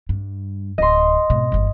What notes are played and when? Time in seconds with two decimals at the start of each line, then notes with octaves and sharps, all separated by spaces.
0.09 G2
0.78 D1 D#5 C6
1.30 G#1 B2
1.52 G1 E2